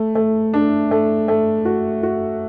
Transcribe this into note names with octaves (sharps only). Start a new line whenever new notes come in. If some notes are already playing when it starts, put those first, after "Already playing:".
Already playing: A3
A3
D4
A3
A3
F#4
F#4